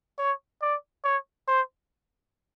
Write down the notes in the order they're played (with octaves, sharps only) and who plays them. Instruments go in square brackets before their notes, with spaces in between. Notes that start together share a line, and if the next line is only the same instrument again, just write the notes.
[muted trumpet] C#5
D5
C#5
C5